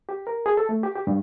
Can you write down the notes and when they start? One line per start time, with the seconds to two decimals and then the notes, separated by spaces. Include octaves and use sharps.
0.09 G4
0.27 A#4
0.46 G#4
0.57 A4
0.69 A3
0.83 G4
0.96 G4
1.07 G2